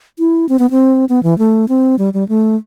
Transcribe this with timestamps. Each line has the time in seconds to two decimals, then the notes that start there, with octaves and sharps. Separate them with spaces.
0.19 E4
0.49 C4
0.59 B3
0.71 C4
1.09 B3
1.23 E3
1.39 A3
1.69 C4
1.99 G3
2.14 G3
2.29 A3